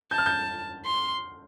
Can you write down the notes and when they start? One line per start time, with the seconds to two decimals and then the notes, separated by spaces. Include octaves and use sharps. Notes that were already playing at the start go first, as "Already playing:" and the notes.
0.11 A5 G6
0.18 F6
0.26 G6
0.85 C6